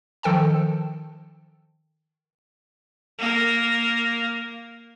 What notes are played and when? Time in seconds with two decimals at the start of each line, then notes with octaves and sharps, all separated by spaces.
0.23 D#3 F3 A4 G5 A5
3.19 A#3 A#4